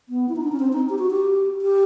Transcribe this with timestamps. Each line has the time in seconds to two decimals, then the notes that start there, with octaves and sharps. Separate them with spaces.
0.09 B3
0.29 E4
0.36 D#4
0.44 D4
0.52 C#4
0.60 C4
0.73 D#4
0.89 G4
0.99 F#4
1.11 G4
1.62 G4